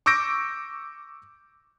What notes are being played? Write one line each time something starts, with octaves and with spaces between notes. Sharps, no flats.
C#6 D6 E6 G6 A#6 D7